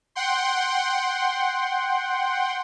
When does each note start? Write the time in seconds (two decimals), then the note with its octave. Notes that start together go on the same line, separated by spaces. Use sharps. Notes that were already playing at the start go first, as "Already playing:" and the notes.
0.15 F#5 G5 C6